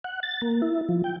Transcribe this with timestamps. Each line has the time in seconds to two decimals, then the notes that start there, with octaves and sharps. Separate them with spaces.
0.04 F#5
0.23 A6
0.42 A#3
0.62 E4
0.89 F3
1.04 G5